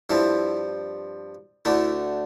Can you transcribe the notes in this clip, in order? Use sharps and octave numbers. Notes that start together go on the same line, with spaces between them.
G2 F3 C4 E4
D2 D3 A3 E4